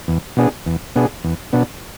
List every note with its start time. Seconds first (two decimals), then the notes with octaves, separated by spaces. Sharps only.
0.08 E2
0.37 B2 B3 D4 G#4
0.66 E2
0.95 B2 B3 D4 G#4
1.24 E2
1.53 B2 B3 D4